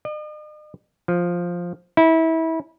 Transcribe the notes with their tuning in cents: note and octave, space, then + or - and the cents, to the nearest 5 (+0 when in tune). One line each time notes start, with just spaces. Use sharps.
D#5 -45
F3 +5
E4 -25